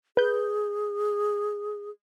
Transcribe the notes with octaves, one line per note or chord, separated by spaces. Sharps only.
G#4 B4 G6